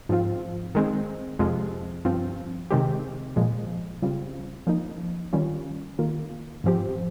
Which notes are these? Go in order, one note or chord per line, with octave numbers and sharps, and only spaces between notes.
G#2 F3 C4 F4
D#3 G#3 C4
F2 C3 F3 G#3
G2 F3 C4
C3 D#3 G#3 C4 G4
A#2 F3 G#3
C#3 G3 C4 F4
F3 A#3 D#4
D#3 G3 C#4 F4
D#3 A#3 F4
G#2 F3 C4 G4